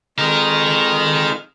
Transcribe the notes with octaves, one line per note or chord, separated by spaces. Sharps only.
F2 G#3 D#4 A#4 F6